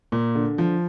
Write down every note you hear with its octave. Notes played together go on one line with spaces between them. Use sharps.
A#2
D3
F3